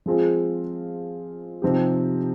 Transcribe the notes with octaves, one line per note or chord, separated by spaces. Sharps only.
F3 G#3 C4 F4 G#4
C3 F3 C4 D#4 G4